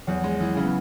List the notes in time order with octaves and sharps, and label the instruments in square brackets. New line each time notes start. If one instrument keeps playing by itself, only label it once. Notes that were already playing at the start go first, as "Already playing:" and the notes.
[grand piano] E2 [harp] F#3
[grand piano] G#3
E3
[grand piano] C#3 [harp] C#4
[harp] B3